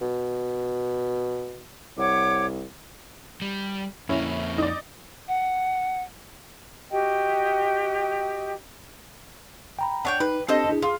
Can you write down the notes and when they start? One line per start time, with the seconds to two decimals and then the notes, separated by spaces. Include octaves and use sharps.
0.01 B2
1.97 C2 C#5 F#5 D6
3.42 G3
4.09 F2 A#3 C#4 E4
4.58 D#4 D5
5.28 F#5
6.91 F#4 G4 D#5 G5
9.79 G5 A#5 B5
10.05 D4 C#5 F#5 G5
10.20 D#4 B4
10.48 C4 D4 G4 A4 C5 D#5
10.69 D4 E4 G#4
10.82 F4 G#4